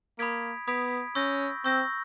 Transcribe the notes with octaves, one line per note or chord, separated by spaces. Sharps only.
A#3 B5 D#6 G#6 B6 D7
B3 B5 D#6 G#6 B6 D7
C#4 C#6 E6 G6 A#6
C4 C#6 E6 G6 A#6